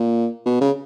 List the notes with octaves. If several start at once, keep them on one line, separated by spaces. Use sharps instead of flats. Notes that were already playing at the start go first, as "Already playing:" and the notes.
Already playing: A#2
B2
C#3